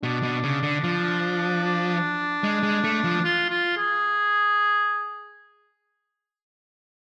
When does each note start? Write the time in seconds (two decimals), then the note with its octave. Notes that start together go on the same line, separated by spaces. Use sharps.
0.03 B2 D4
0.23 B2
0.44 C#3
0.63 D3
0.84 F3
1.64 D4
2.43 G#3
2.63 G#3
2.84 A3
3.04 F3
3.24 F4
3.50 F4
3.77 G#4